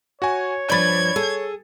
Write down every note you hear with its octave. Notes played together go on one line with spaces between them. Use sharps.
F#4 C#5 G#5
G2 F3 D5 B5 G#6 A6
G#4 A4